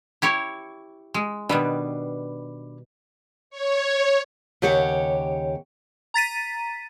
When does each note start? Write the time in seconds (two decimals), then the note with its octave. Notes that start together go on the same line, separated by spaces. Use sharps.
0.22 E4 G4 C#5
1.14 G#3
1.49 B2 D#3 G3 D4 B4
3.50 C#5
4.62 D#2 C#3 G4 C#5 F#5
6.14 A#5 A6 B6 D#7